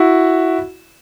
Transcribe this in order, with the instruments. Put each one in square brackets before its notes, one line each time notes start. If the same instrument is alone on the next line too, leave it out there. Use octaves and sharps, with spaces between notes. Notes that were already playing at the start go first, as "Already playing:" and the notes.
Already playing: [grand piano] E4 F#4